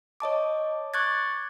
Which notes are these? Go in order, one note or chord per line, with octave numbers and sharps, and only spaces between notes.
C#5 D#5 A5 D6
C#6 D6 F#6 G#6 A6